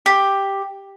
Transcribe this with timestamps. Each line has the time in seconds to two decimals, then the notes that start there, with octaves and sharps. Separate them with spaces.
0.06 G4